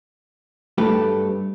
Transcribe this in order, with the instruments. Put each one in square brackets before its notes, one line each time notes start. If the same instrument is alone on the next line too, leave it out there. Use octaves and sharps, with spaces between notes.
[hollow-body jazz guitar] G2 A3 G4 A4 B4